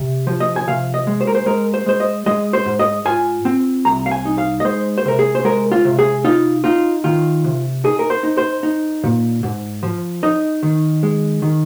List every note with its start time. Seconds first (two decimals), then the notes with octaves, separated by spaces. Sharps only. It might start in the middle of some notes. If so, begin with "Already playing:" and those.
Already playing: C3
0.27 F3
0.40 D#5
0.56 G#5
0.67 C3 F5
0.94 D#5
1.07 G#3
1.21 C5
1.27 A#4
1.35 C5
1.46 G#3 A#4
1.74 C5
1.86 G#3 C5
2.00 D#5
2.26 G#3 D#5
2.53 C5
2.66 G#2
2.79 D#5
3.05 F4 G#5
3.45 C4
3.85 C2 A#5
4.06 F5
4.12 G#5
4.25 D#4
4.38 F5
4.60 D#5
4.65 G#3 C5
4.98 C5
5.05 C3 A#4
5.19 G#4
5.35 C5
5.44 G#3 A#4
5.72 F4
5.85 C3
5.99 G#4
6.25 D#4 F4
6.64 D#4 F4
7.04 D#3 F4
7.44 C3
7.84 D#4 G#4
7.99 A#4
8.10 C5
8.23 D#4
8.38 C5
8.63 D#4
9.04 A#2
9.43 G#2
9.83 F3
10.23 D#4 D#5
10.63 D#3
11.03 G#3
11.42 D#3